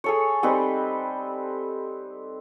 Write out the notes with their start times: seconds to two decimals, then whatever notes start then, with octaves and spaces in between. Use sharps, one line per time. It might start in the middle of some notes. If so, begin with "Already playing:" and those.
0.04 G#4 A4 C#5
0.43 G3 C4 D#4 B4